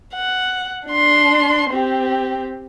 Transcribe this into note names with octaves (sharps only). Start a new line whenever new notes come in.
F#5
D4 C6
C4 G4